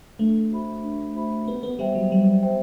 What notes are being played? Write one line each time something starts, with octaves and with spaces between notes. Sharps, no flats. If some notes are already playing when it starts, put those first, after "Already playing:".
A3 D4
F#4 C5 E5 B5
D4
F#4 C5 E5 B5
B3 G4
B3
G3 C5 E5 G5
F#3
G3 G4
C5 E5 G5